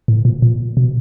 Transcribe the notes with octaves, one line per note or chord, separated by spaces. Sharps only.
A2
A#2
A#2
B2